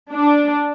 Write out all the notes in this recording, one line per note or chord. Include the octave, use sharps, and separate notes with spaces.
D4